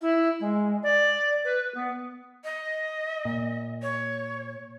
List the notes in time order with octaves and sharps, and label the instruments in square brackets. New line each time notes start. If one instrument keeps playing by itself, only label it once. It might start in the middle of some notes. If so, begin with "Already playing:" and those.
[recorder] E4
G#3
D5
B4
B3
[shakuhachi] D#5
[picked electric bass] A#2
[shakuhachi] C#5